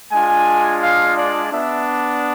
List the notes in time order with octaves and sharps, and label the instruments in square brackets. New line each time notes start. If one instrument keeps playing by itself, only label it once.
[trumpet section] G#3 D4 F4 G#5
F5
D5
B3 D4 E5